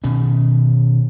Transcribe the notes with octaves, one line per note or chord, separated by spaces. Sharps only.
B2 D#3 C#4